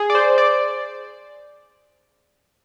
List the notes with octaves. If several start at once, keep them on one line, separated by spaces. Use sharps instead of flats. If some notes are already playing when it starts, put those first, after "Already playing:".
Already playing: G#4
D5
C5
D5